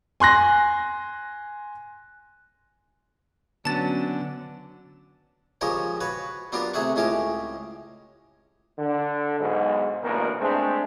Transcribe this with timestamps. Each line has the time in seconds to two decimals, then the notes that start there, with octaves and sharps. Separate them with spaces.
0.20 G#5 C6 F#6 A#6
3.65 D3 F#3 B3 C#4 A5 A6
5.61 C#3 F3 G#3 G4 A#4 C#5
6.01 F#4 B4 C#5
6.52 F#3 B3 D4 F4 G4 A#4
6.74 C3 A3 G#4 E5 F#5 C#6
6.96 C#2 A2 G#3 C#4 G4 D6
8.79 D3
9.41 B1 G#2
10.04 A1 D2 G2 B2 A#3 A#4
10.41 G#3 A3 C4 D4 G#4 C5